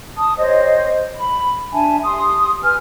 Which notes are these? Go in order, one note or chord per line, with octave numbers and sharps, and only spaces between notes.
A5 D#6
G4 C5 C#5 D#5
B5
D4 E5 G#5 A5
G4 C6 D#6
B4 G#5 F6